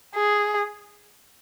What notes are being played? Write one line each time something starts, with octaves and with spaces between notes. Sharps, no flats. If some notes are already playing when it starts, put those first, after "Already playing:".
G#4